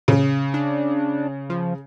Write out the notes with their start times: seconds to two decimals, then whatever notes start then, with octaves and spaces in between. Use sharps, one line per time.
0.08 C#3
0.54 D4
1.50 F3